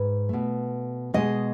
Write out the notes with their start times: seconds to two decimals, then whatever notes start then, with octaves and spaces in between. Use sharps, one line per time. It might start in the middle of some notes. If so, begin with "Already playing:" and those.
Already playing: G#2 B4
0.29 B2 A3
1.14 B2 G#3 D#5